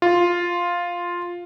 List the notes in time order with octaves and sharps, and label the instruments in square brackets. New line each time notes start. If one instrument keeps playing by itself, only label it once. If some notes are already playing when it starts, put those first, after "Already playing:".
[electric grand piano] F4